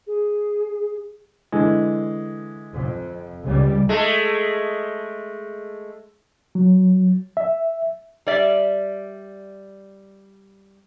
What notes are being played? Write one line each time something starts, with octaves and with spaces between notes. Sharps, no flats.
G#4
D3 E3 G#3
F2
C#2 C#3 G3
G#3 A3
F#3
E5
G3 D5 E5